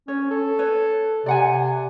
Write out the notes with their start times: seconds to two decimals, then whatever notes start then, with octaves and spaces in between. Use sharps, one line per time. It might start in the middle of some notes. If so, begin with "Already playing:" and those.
0.08 C#4 C#5
0.31 A4
0.59 B4 C#5
1.26 C3 D5 F#5 G#5